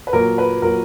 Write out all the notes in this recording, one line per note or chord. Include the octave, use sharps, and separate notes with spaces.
B4
A#2 F#3 A#4
B4
A#2 F#3 A#4